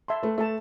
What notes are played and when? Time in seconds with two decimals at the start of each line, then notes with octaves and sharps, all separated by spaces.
0.08 E5 A5 C6
0.23 A3 B4
0.38 A3 E5 A5